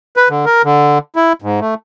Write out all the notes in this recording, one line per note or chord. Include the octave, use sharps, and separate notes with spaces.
B4
D3
A#4
D3
E4
G#2
A3